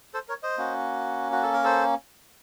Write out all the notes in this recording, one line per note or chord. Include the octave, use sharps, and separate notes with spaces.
A4 C5
A#4 C#5
C5 D#5
A#3 C#4 F#4
F#4
A4
A#4
A4 C5